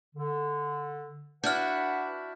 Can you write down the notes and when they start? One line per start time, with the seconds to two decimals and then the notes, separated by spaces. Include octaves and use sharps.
0.16 D3
1.44 D4 E4 F#4 B4 F#5 F6 G6